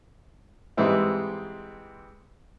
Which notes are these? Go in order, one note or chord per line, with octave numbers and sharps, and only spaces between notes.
G#2 E3 G3 G#3 C4 E4